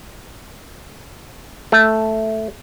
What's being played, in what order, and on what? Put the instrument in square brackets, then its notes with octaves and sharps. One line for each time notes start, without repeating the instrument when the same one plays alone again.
[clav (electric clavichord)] A3